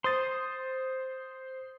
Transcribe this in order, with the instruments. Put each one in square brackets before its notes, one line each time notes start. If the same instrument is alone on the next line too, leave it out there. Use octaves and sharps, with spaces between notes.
[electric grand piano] C5 D#6 A6 [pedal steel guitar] C6